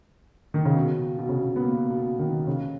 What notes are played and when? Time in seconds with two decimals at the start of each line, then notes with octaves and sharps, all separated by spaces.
0.54 D#3
0.65 C#3
0.76 B2
1.19 B2
1.29 C#3
1.38 B2
1.56 B3
1.62 A#3
1.90 B2
2.19 D#3
2.47 C#3